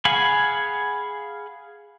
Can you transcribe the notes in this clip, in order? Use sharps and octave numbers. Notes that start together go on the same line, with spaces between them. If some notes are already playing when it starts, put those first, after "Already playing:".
G#4 F5 F#5 G#5 B5